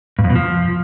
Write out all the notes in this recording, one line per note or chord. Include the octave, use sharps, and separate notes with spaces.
G2
F2
B2
F3